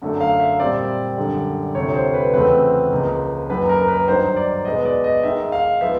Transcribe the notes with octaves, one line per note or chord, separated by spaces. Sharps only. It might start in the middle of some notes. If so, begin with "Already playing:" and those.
F#2 D3 F#3 A3
F5
E5
A#2 G3 C4 D5
F#2 D3 G3
D2 C3 F3 C#5
C5
B4
E2 C#3 F3 A3 C4 B4
C#2 C#3 F3 A#3
F#2 D#3 F#3 A#3 B4
A#4
B4
G2 D#3 F#3 C5
D5
B2 G#3 B3 D#5
D5
D#5
G#2 D#3 G#3 E5
F5
F3 G#3 B3 E5